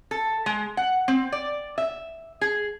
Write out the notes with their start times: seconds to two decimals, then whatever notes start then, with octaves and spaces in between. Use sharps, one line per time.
0.11 A4
0.46 G#3
0.77 F#5
1.08 C4
1.32 D5
1.78 E5
2.41 G#4